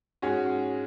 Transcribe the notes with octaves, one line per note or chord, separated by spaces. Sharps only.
G#2 G#3 C#4 F#4